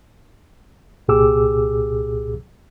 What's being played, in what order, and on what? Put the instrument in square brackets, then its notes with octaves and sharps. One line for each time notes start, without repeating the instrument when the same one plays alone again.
[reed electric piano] C2 A#2 G4 G#4 D6 E6